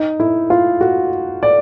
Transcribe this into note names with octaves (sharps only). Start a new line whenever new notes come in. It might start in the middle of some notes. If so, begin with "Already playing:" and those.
Already playing: D#4
E4
F4
F#4
D5